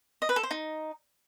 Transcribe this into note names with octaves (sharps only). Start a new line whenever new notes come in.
D#5
B4
A4
C5
D#4